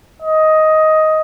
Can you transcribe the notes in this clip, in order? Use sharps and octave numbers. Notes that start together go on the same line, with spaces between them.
D#5